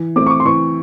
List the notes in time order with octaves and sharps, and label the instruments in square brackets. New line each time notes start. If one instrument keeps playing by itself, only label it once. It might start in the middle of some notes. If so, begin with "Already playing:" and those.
Already playing: [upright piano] E3
[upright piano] A3 C4 [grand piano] D6
[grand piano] C#6
D6
C6
[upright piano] E3 [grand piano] C#6